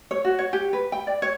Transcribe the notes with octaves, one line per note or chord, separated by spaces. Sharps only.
C#5
F#4
C#5
G4
B4
G5
D5
C#5